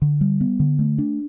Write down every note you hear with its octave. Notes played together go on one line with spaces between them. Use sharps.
D3
G3
B3
D3
A3
D4